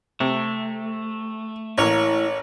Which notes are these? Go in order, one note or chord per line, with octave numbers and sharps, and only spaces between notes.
C3 A3
A1 A#3 E4 C#5